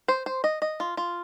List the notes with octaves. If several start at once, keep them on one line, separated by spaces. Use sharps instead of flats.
C5
C5
D#5
D#5
F4
F4